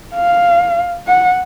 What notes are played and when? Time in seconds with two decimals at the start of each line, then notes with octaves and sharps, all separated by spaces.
0.14 F5
1.07 F#5